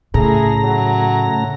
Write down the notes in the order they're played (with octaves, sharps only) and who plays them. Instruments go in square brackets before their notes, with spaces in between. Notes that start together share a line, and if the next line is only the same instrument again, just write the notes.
[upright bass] A2 [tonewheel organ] C#3 A3 A#5 [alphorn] G#4
[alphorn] F#3